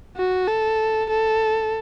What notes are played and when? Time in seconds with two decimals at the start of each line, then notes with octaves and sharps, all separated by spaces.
0.17 F#4
0.48 A4
1.10 A4